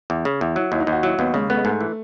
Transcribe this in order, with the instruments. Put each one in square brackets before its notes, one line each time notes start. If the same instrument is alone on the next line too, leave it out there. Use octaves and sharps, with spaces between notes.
[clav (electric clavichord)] E2
C#3
E2
[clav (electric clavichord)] F#3 [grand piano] E4
[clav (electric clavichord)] D#2 [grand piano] E4
[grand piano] D#4
[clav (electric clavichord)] D#2
[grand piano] F#4
[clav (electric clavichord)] F#3 [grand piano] E4
[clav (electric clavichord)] D#2 [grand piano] B3
[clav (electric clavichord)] C#3 [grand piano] G#3
[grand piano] A3 [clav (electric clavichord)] B3
[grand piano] G#3
[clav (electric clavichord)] G#2 [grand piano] A3
[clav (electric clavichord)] E3